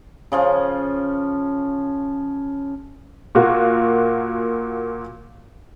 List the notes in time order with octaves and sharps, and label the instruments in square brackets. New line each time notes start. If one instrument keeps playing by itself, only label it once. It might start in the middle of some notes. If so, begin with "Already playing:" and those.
[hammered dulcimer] C#3 F3 C#4
[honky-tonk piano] A#2 A#3 F4 F#4